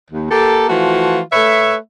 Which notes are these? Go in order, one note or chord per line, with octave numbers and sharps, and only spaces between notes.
D#2
A#3 G4 A4
E3 F3 A3 F4 F#4
A3 B4 C#5 E5